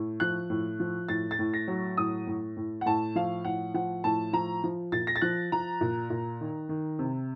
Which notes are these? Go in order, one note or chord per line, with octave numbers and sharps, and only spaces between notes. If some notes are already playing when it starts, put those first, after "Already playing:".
Already playing: A2
F3 F#6
A2
F3
A2 A6
A6
A2
A#6
F#3
A2 D#6
A2
A2
F#5
A2 A5
F3 F5
A2 F#5
F3 F#5
A2 A5
F3 A#5
F3
A#2 A6
A#6
A6
F3 F#6
F3 A#5
A#2
A#2
D#3
D#3
C3